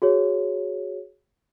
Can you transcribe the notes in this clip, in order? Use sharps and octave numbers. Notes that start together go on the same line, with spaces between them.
F#4 G#4 C#5